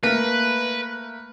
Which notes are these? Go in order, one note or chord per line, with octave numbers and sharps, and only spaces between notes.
A3 A#3 B4